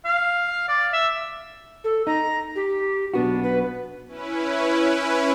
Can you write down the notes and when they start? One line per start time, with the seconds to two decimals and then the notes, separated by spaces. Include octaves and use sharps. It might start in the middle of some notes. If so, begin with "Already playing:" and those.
0.05 F5
0.69 D5
0.93 E5
1.84 A4
2.07 D#4 A#5
2.55 G4
3.14 B1 B3 D4 F#4
3.43 B4
4.08 C#4 E4 B4